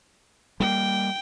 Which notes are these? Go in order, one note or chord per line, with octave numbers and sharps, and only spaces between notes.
G3 G#3 A#3 G5